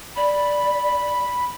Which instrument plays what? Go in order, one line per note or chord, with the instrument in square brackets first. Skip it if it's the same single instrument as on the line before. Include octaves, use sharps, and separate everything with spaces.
[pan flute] D5 [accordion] B5